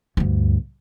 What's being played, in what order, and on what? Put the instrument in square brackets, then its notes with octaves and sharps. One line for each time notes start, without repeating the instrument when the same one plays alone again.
[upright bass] D2 G2